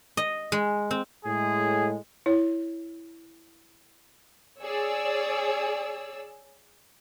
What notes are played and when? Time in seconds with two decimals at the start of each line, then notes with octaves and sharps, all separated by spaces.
0.17 D#5
0.52 G#3
0.91 C4
1.25 A2 G#3 G#4
2.26 E4 C#5
4.62 G#4 C#5 D5 E6